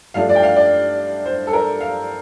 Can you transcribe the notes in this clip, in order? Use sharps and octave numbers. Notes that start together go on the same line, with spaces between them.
G2 F3 A3 D4 F4 F5
D5
G5
F5
D5
C5
A4
A#4
F5